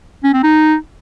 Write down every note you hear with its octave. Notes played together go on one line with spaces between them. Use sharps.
C#4
C4
D#4